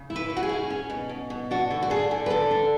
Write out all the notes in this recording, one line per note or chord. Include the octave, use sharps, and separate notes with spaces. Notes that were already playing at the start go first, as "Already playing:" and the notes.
Already playing: C#3
E4
B4
C#3
F#4
G#4
C#4
C#4
B2
B2
B2
D4 F#4
D3
F#4
D4 G#4
D3
B4
D3 A4
D4